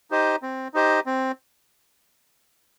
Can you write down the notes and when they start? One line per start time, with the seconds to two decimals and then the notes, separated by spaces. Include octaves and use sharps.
0.11 D#4 G4 C5 D#5
0.42 C4
0.74 D#4 G4 C5 D#5
1.06 C4